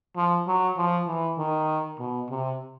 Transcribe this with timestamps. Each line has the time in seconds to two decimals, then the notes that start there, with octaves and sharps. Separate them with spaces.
0.16 F3
0.47 F#3
0.77 F3
1.07 E3
1.38 D#3
1.99 B2
2.30 C3